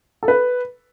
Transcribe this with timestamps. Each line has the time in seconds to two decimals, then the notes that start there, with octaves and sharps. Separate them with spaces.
0.23 A4
0.28 B4